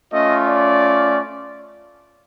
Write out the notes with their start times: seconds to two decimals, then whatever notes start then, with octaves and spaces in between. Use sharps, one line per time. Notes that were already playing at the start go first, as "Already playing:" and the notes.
0.12 A3 C#4 F4 D#5
0.47 D5